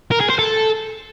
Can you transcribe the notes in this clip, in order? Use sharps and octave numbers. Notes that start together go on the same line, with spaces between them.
A#4
G#4
C5
A4